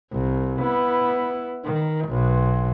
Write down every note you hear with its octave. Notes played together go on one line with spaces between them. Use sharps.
C2
B3 E4
D#3
B1